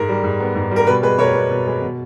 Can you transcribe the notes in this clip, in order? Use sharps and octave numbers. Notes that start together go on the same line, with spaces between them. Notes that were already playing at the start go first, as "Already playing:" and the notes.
Already playing: G#2 A#4
G3
G#2
B3
G#2
G3
A#4
B2 B4
G#3 B4
B2 A#4 C#5
B3
B2
G#3
B2